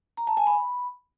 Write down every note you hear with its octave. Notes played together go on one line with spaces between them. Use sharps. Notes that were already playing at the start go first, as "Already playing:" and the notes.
A#5
A5
G#5
B5